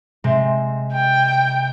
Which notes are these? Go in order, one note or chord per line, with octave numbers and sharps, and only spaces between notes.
C3 G#3 C4
G5